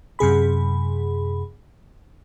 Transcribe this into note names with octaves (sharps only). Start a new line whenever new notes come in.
F#2 C3 G#4 B5